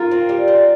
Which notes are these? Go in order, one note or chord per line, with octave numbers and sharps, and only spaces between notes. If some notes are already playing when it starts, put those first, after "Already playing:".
Already playing: F4 A#4
C4
G3
C4